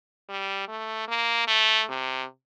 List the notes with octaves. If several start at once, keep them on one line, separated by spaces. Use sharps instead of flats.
G3
A3
A#3
A3
C3